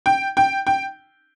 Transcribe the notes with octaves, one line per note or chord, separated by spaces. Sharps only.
G5
G5
G5